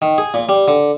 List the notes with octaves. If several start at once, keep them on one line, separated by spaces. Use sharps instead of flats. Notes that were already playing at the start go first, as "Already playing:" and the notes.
D#3
G#4
A#2
G3
D3